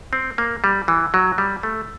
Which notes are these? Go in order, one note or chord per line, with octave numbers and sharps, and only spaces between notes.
C4
A#3
G3
E3
F#3
G3
A3